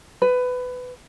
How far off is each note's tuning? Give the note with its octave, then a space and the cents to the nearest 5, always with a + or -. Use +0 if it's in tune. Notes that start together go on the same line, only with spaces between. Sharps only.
B4 +20